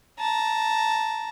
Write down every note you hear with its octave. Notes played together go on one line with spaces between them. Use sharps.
A5 A#5